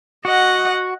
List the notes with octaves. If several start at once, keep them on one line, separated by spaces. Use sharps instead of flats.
F#4 D#5 F#5